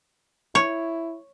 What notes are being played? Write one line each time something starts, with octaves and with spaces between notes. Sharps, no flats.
E4 C#5